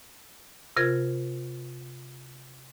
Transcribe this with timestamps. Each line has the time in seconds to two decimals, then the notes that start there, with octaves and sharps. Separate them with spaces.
0.77 C3 F4 A#4 G#6